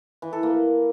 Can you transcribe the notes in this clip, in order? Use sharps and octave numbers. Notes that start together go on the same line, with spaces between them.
E3
A4
A#3